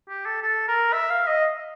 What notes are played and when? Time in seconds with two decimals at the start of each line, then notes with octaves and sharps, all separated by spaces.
0.09 G4
0.26 A4
0.43 A4
0.68 A#4
0.93 E5
1.10 F5
1.27 D#5